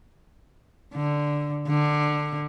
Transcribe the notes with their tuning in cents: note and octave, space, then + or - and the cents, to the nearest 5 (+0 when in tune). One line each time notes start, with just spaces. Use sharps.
D3 +0
D3 +15